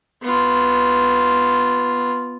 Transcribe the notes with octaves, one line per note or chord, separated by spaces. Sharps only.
B3 F4